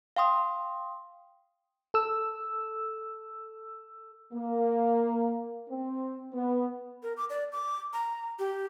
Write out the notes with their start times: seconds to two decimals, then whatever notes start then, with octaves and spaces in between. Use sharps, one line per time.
0.16 F5 G5 C6 D#6
1.94 A4 E6
4.33 A#3
5.69 C4
6.33 B3
7.03 A#4
7.17 D6
7.30 D5
7.53 D6
7.93 A#5
8.39 G4